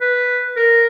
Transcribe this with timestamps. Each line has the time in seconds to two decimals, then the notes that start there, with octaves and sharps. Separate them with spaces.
0.01 B4
0.56 A#4